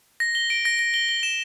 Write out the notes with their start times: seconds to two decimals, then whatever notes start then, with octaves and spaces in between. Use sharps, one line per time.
0.20 A#6
0.35 G7
0.50 D7
0.65 A#6
0.79 A#6
0.94 G7
1.09 G7
1.23 E7